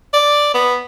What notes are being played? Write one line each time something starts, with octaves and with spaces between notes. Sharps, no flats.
D5
B3